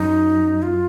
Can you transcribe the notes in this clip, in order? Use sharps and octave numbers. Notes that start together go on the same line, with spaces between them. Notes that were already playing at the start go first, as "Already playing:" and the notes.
Already playing: F#2 D#4
F4